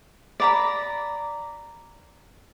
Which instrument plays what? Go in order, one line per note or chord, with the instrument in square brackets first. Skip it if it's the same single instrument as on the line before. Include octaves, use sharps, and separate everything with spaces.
[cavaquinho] D5 A#5 B5